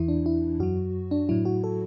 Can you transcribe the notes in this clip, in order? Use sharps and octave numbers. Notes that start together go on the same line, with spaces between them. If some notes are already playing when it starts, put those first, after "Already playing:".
Already playing: E2 E3 E4
D4
E4
F#2 F#3 F#4
D4
A2 F#3 E4
F#4
A4